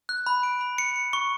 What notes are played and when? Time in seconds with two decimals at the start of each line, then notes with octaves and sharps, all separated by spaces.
0.09 F#6
0.26 B5
0.43 D7
0.61 B5
0.78 C#7
0.96 C#7
1.13 C#6